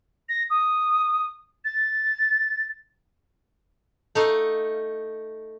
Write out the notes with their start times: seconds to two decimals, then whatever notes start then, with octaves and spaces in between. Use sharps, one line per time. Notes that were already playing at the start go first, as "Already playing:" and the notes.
0.29 A#6
0.50 D#6
1.65 A6
4.15 A3 D#4 F5